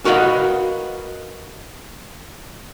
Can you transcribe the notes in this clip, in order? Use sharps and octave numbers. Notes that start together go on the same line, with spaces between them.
F#4 A#4 B4 D#5 F5 F#5